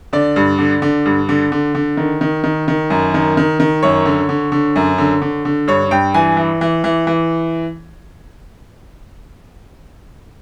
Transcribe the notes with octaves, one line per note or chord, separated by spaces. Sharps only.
D3 D5
G2
D3
D3
G2
D3
D3
D3
D#3
D#3
D#3
D#3
F#2
D#3
D#3
D#3
F#2 C#5
D3
D3
D3
F#2
D3
D3
D3
G2 C#5
G2 G5
E3 G#5
E3
E3
E3
E3